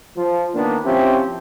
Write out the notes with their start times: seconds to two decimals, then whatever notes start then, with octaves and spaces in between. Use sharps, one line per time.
0.17 F3
0.55 D#3 A#3 B3 D4
0.85 F3 C4 C#4 E4 G4